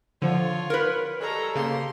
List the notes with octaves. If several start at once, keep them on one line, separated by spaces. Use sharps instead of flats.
D3 F3 F4 C#5
A#4 B4
G3 G#3 A4 C#5 A#5
C#3 A#3 G4 C6